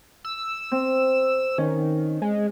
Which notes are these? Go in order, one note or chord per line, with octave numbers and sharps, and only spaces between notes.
E6
C4
D#3 C#4
G#3